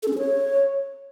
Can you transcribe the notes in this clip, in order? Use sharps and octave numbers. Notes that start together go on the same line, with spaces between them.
A4
C#4
G#4
C#5